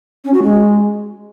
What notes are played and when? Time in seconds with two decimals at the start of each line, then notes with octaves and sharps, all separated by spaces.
0.25 C#4
0.34 F#4
0.43 G#3